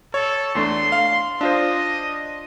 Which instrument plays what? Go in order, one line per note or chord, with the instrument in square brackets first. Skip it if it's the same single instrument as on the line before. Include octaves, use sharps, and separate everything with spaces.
[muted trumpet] A4 [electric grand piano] C#5
[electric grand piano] E2 A3 D4 [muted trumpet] C6
[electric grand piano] F5
[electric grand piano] D4 F4 C5 [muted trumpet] D#5